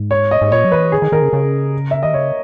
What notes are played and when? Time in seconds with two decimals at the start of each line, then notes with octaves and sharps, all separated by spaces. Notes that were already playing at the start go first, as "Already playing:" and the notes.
Already playing: G#2
0.11 C#5
0.31 D#5
0.41 G#2
0.52 A#2 C#5
0.64 F#3
0.72 E3 B4
0.92 D#3 G#4
1.02 D#3
1.12 D#3 A#4
1.22 C#3
1.33 C#3
1.91 E5
2.03 D#3 D#5
2.14 C#3 C#5